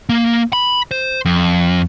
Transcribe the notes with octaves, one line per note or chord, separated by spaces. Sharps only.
A#3
B5
C5
F2